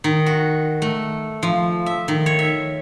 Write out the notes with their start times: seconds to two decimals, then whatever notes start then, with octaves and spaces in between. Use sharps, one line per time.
0.04 D#3
0.26 F#4
0.82 A3
1.43 F3
1.86 E5
2.08 D#3
2.26 C#5
2.39 E5